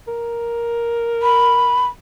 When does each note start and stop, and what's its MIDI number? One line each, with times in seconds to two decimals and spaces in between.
0.08 1.94 70
1.23 1.86 83